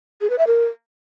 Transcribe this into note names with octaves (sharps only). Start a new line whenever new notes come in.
G#4
B4
E5
A#4